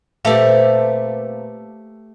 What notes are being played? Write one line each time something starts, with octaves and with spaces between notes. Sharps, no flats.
A#2 A3 C4 G4 B4 E5 F5